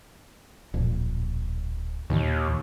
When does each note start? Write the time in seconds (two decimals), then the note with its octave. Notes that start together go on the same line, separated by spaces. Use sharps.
0.74 D1 F2 A#2
2.10 D#2 A#2 D#3